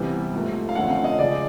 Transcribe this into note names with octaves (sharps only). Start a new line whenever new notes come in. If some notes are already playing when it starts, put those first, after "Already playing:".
Already playing: C3 E3 G3 B3
G#2 F3 A3
F5
F2 D3 F3 A3 C#4 F#5
F5
D#5
C#3 F3 G#3 D5